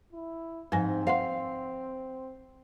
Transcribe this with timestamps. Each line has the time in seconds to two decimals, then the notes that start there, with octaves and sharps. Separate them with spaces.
0.13 E4
0.72 G#2 F3 C4 G#5 A#6
1.07 C5 F5 F#5 C6